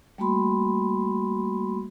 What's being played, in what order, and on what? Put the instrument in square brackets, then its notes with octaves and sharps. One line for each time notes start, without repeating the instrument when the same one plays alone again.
[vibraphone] G3 A3 A#3 F#4 B5 C6